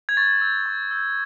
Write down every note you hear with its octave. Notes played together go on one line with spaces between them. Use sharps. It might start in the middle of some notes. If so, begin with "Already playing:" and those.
G#6
C#6 A6
E6 G6
C#6
E6 G6